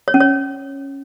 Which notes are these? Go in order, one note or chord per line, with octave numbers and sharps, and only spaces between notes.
C#5
C#4
C#5